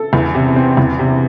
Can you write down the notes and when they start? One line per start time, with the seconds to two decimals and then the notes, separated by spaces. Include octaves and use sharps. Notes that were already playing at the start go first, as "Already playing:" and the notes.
Already playing: A4
0.13 E2
0.34 C3
0.56 C4
0.77 E2
0.99 C3